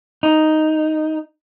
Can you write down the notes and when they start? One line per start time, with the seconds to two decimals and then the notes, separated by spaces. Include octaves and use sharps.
0.23 D#4